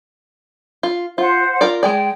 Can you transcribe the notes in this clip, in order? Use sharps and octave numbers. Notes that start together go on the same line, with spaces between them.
F4
F4 C5 F#5
F4 A#4 D5
G#3 G#4 D5 G5